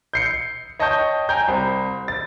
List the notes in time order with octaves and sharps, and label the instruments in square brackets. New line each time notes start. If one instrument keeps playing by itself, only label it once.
[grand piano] G6 C7 C#7
C#5 D#5 G5 A5 C#6 G6
G5 G#5 A#5 G6
C2 C4
A6